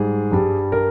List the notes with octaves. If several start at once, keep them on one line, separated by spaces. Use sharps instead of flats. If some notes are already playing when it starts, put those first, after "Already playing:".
Already playing: G#2 G3 G#4
G2 G3
A#4